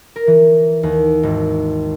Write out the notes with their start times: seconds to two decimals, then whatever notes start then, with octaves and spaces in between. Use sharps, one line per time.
0.16 A#4
0.27 E3
0.83 D#2
1.23 G#1